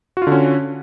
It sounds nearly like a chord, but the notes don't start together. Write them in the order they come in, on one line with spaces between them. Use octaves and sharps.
F#4 F4 D3 C#4